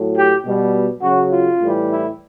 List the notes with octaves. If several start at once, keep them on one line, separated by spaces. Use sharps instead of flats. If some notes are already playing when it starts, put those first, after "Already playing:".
Already playing: A2 F#3
G4
B2 G3
C#3 F#3 F#4
F4
A2 E3 G3
E4